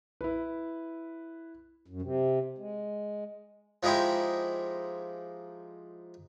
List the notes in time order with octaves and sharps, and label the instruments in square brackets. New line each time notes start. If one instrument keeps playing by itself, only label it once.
[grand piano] E4 B4
[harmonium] F#2
C3
G#3
[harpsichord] F3 G#3 D#4 E4 G4